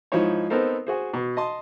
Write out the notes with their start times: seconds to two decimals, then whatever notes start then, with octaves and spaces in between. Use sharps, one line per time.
0.12 G#2 F3 D#4 E4 C5 C#5
0.50 B3 C4 D#4 A4 A#4 C5
0.87 F#4 G#4 C5
1.13 B2
1.37 D#5 A5 C6